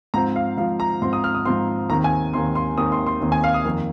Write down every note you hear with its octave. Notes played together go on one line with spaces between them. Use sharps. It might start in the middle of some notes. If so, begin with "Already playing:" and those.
G#2 F3 C4 A#5
F5
G#2 F3 C4 F5
A#5
G#2 F3 C4 C6
D#6
F6
D#6
G#2 F3 C4 C6
D#2 D#3 C4 A#5
G#5
D#2 D#3 C4 C6
C6
D#2 D#3 C4 D#6
C6
C6
D#2 D#3 C4
G#5
F5
D#6
F2 D#3 A#3